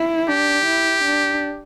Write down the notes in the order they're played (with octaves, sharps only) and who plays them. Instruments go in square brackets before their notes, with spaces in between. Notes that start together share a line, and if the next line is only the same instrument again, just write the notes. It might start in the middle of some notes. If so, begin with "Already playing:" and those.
Already playing: [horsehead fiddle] E4
[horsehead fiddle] D4 [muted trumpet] G4
[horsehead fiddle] E4
D4